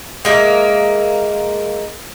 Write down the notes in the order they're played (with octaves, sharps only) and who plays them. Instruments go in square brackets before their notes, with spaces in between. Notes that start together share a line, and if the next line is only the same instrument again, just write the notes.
[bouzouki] G#3 A#3 E5